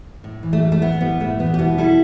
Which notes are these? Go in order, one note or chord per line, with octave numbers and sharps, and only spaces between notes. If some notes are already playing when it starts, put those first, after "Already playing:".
A2
E3
A3
G3
A3
A2 B3
G3 B3
A2 A3
E2 B3
G4
B2 B3 E4
G3 E4 A4